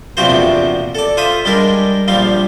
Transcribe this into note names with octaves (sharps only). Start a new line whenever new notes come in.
A#1 E2 C3 F3 F#4 C5
A4 D5
F4 C5 E5 D#6
G3 G#3 D4 A#4
A#1 F3 G3 F5